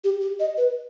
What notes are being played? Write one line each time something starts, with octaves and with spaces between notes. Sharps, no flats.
G4
G4
D#5
B4